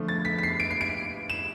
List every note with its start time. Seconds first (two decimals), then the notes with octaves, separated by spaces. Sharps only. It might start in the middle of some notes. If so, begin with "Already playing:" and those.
Already playing: D3 F3 A3
0.08 A6
0.25 B6
0.38 B6
0.43 C7
0.60 D7
0.71 C7
0.81 D7
1.30 E7